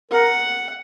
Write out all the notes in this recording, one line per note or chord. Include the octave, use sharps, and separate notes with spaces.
A#4 F#5